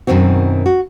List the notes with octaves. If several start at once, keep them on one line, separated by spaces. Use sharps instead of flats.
F#2 B2 D#3 C4 F#4
F#4